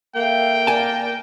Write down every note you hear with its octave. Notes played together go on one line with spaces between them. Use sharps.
A#3 A4 E5 F5 G5
A#4 D5 G#5 A5